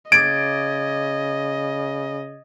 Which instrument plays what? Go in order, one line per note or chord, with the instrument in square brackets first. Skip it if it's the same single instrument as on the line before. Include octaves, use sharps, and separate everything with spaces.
[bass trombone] C#3 [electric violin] D#5 [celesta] G#6 A6 [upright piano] D7